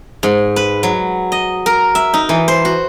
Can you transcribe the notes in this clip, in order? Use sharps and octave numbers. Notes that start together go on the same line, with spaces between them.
G#2
B4
F#3
D#5
A#4
E5
D#4
E3
C5
F#4